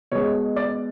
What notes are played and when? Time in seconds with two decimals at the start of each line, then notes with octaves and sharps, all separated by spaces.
0.12 B2 G#3 C#5
0.56 D5